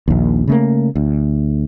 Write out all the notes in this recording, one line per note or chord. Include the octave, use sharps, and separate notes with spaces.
A#1 D#2
C#3 A3 A#3
D2